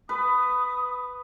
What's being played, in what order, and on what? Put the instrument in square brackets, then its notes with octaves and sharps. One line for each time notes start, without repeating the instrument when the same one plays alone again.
[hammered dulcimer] B4 [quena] D#6